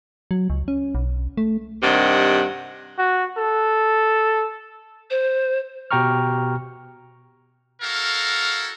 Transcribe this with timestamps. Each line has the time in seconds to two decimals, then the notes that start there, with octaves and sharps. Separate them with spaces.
0.31 F#3
0.50 C#2
0.68 C#4
0.95 B1
1.37 A3
1.83 G2 C3 D#3 F#5
2.98 F#4
3.38 A4
5.10 C5
5.91 B2 G4 G5 A#5 C#6 F6
7.81 E4 F#4 A4 A#4 F5